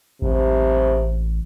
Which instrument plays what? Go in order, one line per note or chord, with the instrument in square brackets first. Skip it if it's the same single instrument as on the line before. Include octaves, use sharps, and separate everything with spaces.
[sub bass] A1 [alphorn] C3